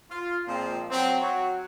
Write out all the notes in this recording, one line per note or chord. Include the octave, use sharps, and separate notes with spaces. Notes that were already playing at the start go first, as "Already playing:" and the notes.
F4
A#2 F3 G#3 C4
F#3 C4
F#3 F#4 C#5